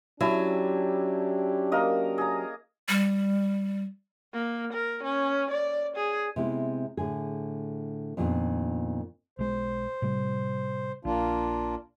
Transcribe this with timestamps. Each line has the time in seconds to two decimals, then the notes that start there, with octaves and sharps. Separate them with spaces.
0.21 F#3 C#4 D4 E4 G4 A5
1.72 A#3 A#4 D#5
2.18 G#4 A#5
2.89 G3
4.33 A#3
4.73 A#4
5.04 C#4
5.51 D5
5.97 G#4
6.36 C3 G#3 B3 C4 E4
6.97 A2 D3 G#4
8.17 F2 A#2 D#3 G#3 B3 D4
9.39 B1 G#3 C5
10.02 A2 C3 G3
11.05 A#1 A#3 D4 F4